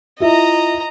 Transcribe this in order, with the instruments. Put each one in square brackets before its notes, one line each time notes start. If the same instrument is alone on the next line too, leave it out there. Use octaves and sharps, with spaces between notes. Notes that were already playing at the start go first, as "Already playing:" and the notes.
[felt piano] E4 F4 E5 [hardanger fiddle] D#5 A#5